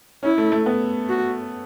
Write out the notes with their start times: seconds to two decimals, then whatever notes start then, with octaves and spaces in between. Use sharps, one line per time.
0.23 C#4 E4
0.38 A3
0.52 A3
0.66 B3
1.09 F#4